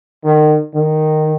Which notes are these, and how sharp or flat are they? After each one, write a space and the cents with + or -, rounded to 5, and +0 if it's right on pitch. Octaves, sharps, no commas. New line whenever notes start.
D#3 -35
D#3 -10